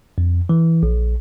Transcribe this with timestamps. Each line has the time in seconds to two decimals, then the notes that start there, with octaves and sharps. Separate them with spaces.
0.18 F2
0.49 E3
0.83 A#1